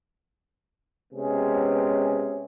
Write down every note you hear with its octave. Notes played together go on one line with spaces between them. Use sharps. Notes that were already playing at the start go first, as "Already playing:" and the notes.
C3 G#3 B3 C#4 G#4